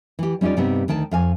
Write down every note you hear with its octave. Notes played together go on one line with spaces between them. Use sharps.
E3 G4
G3 C#4 D#4 F4 D5
G2 C3 G3 B3 C4 D#4
D2 D#3 G5 A5
F2 F5 G#5